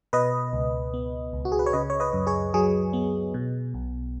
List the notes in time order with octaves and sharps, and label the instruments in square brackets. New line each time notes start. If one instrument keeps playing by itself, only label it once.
[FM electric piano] B2 B4 D#5
C#2
B3
C#2
F#4
G#4
B4
C#5
C#3 B4 D#5
C#5
B4 D#5
F#2
G#4 C#5
F#3 G#4
B3
B2
B1